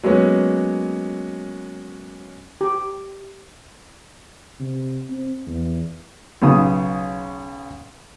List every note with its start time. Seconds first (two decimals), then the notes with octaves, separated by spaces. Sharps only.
0.03 F#3 G#3 A#3 B3 C#4
2.61 G4
4.60 C3
5.10 C4
5.47 E2
6.42 B1 C#3 D#6